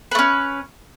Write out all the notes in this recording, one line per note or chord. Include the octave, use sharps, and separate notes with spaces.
A3 C#4 B4